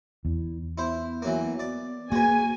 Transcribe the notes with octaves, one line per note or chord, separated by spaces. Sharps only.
E2 E4
B3 E4 C5
E3 F#3 A#3
D5
A#3 F#4 G#4 B4 G#5